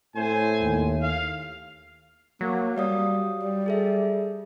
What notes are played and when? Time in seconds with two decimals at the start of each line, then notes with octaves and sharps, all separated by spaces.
0.16 A2 C4 C5 G#5
0.62 D#2
1.02 F5
2.41 F#3 A#3
2.77 G3 G4 F5 D#6
3.43 G3
3.66 G#4 A4 E5